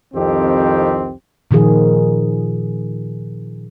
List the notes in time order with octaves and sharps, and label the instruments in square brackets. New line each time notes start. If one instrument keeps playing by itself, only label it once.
[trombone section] C2 F2 D#3 C4 G4
[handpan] A#2 D#3 F3 G#4